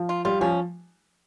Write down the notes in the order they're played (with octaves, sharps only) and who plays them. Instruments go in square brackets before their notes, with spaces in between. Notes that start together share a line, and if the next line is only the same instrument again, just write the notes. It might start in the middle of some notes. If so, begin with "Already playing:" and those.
Already playing: [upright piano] F3
[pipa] F4
[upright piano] G3 [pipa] F4
[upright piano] F3 [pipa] C#4